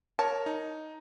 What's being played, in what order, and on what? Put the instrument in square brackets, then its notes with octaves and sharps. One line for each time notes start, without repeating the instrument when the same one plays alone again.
[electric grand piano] A#4 C#5 [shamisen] A5
[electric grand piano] D#4